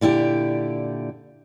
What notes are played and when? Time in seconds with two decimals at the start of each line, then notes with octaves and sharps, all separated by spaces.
0.01 A#2 D3 E4 G4 D5